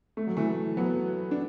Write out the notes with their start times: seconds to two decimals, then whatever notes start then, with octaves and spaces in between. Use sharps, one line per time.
0.17 A3
0.27 F#3
0.37 E3 A3
0.77 F#3 B3
1.31 D4